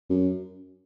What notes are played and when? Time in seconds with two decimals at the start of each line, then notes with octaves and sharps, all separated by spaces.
0.10 F#2